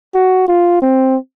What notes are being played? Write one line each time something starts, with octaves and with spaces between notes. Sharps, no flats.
F#4
F4
C4